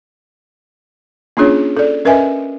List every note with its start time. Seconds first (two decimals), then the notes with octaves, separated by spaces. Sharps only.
1.37 A#3 C#4 D4 F4 G#4 C#5
1.77 A4 D5
2.05 C#4 A#4 B4 D#5 E5 G#5